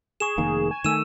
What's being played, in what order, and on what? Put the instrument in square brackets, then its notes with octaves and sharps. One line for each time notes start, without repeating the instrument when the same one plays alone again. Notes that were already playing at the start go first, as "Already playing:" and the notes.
[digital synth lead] G#4 [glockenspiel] C#6 E7
[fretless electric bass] F1 D#3 A#3
[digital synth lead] G#5
[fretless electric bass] D#3 A3 [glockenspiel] E6 D#7 E7